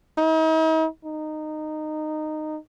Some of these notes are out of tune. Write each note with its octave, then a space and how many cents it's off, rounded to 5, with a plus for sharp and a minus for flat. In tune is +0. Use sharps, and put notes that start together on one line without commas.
D#4 +45
D#4 -15